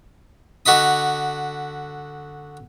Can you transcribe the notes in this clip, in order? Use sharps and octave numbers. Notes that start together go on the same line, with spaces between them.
D3 F#4 D#5 B5 D#6